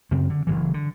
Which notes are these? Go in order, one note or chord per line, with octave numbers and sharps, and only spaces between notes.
F#2 C#3 C4
D3
F#1 D#2 E3
D3